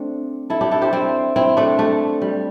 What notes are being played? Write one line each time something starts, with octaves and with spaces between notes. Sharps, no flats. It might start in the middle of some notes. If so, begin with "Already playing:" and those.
Already playing: A3 C4 D4
E4 A4
D4 G4
E4 A4
G4 C5
C4 E4
C4 E4
A3 D4
A3
G3